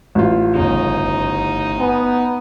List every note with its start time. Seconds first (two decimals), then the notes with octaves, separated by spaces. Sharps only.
0.15 A1 F4
0.55 G1 C#3 D#4
1.80 B3 G#5